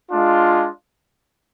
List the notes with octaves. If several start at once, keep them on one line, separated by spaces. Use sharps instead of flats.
G#3 D4 F4